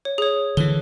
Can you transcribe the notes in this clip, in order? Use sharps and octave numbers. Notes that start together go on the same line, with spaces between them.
C#5
G#4 C#5
D3 E3 G7